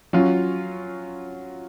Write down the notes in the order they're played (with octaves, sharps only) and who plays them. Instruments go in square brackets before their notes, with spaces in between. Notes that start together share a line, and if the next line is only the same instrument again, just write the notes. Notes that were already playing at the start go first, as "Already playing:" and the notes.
[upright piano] F#3 C#4 F4